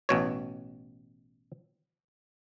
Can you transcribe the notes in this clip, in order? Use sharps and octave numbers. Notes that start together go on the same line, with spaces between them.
A1 B2 C#5